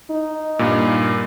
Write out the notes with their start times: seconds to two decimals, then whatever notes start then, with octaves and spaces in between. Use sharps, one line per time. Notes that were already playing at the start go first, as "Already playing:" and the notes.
0.11 D#4
0.59 G2 A#2